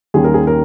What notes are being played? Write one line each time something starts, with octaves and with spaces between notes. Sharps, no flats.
D#2 D#3 G3 C#4 G#4
A#4
G#4
A#4